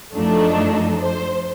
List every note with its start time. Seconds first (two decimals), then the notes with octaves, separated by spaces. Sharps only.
0.14 F#2 F3 A3 D4 D#4
0.99 C5